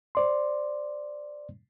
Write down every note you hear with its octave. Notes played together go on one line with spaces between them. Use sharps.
C5 D5 C6